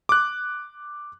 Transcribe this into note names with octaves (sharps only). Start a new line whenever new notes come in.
D6 F#6